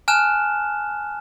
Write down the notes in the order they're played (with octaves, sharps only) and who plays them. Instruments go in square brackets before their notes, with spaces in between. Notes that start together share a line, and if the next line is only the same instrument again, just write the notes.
[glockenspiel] G#5 A5 F6 F#6 E7